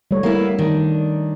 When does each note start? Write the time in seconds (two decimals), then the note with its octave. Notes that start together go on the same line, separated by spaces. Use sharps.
0.11 G3 A3 C#5
0.23 A#3 B3 E4
0.58 D#3 D4